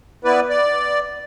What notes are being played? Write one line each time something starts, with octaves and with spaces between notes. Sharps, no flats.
B3 E4 B4 D5
D5